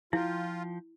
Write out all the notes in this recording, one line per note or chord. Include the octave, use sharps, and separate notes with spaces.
F3 E4 F4 G5